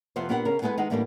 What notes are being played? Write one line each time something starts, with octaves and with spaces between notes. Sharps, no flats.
F2 C3 B3 F4 C5
A#2 B3 D4 G4 A#4 F#5
C#3 A#4
G#3 B3 E4 G#4 A4 B4
D#3 G#3 D#4 F#5
E2 A2 G3 A#3 C4 D4